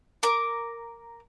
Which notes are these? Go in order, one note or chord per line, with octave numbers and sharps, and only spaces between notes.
A#4 D6